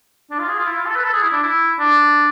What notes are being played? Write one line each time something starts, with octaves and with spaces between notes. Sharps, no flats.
D4
F4
G#4
F4
E4
F4
A4
B4
A4
G#4
E4
D4
E4
D4